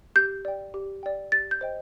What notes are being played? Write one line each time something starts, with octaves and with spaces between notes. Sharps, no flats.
G4 G6
D5 G5
G4
D5 G5
G4 A6
G6
C5 D#5 G5